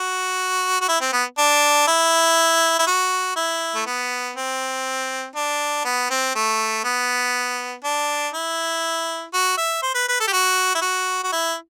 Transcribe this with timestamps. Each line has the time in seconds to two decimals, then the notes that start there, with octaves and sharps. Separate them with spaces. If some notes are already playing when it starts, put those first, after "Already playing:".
Already playing: F#4
0.81 F#4
0.88 E4
1.01 C4
1.12 B3
1.38 D4
1.87 E4
2.79 E4
2.87 F#4
3.36 E4
3.75 A3
3.86 B3
4.36 C4
5.36 D4
5.85 B3
6.10 C4
6.35 A3
6.84 B3
7.84 D4
8.34 E4
9.34 F#4
9.57 E5
9.82 C5
9.95 B4
10.08 B4
10.20 A4
10.27 G4
10.33 F#4
10.75 E4
10.82 F#4
11.24 F#4
11.32 E4